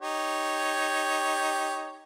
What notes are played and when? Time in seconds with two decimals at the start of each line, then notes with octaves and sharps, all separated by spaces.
0.01 D#4 G4 C#5